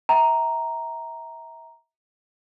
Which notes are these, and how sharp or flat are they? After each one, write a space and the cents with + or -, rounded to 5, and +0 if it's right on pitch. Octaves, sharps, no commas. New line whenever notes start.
E5 -30 G5 -30 A#5 +0